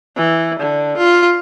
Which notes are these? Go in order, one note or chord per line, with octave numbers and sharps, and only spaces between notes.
E3
D3
F4